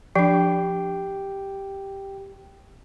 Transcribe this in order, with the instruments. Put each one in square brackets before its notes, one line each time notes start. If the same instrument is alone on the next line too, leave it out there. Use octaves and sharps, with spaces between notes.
[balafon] F3 D4 [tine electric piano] G4 G5